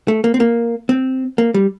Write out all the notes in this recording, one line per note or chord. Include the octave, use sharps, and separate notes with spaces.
A3
A#3
C4
A#3
C4
A#3
G3